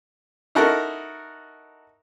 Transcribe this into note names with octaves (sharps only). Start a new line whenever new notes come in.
D#4 E4 F#4 A4 A#4